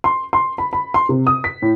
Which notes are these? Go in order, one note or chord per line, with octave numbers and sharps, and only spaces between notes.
C6
C6
B5
B5
C6
C3
D#6
B6
A2